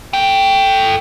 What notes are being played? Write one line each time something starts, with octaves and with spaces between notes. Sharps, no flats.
A4 G5